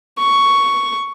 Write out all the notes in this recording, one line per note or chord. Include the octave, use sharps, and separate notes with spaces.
C#6